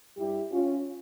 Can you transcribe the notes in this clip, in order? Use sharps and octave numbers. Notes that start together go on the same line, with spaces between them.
G2 G3 E4 G4
C#4 F4